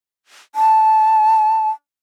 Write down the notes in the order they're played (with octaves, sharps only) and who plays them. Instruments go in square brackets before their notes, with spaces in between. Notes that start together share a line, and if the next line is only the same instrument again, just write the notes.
[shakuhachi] A5